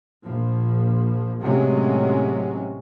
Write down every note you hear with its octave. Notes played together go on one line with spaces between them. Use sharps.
A#1 F3
A1 A2 C3 F#3 G#3 C#4